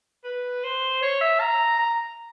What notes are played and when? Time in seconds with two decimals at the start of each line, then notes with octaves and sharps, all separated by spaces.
0.24 B4
0.64 C5
1.02 C#5
1.21 E5
1.40 A#5
1.79 A#5